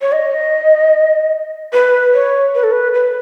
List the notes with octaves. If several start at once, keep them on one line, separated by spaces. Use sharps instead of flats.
C#5
D#5
B4
C#5
B4
A4
B4
B4